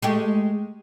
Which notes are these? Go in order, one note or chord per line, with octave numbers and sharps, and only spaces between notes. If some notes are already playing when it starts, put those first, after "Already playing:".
G#3 A3 G4